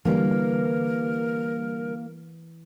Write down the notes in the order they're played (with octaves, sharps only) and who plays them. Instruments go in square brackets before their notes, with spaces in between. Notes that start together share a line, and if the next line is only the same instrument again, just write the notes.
[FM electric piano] D3 G3 [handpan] E3 [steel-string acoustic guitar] A#3 [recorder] A#4